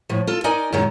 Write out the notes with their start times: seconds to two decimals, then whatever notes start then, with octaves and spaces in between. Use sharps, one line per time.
0.09 A2 F3
0.27 F4 A4
0.44 D#4 A#4 D5 D#5 G#5
0.72 F#2 A#2 D#3 G#3